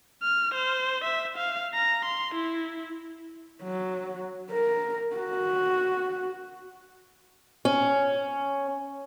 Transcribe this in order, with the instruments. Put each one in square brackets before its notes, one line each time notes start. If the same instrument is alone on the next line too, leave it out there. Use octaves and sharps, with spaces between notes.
[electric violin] F6
C5
E5
F5
A#5
C6
E4
[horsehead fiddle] F#3
A#4
F#4
[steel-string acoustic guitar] C#4